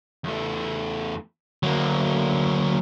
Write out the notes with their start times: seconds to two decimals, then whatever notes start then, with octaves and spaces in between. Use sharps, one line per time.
0.24 E2 A3
1.63 D2 F#3 A#3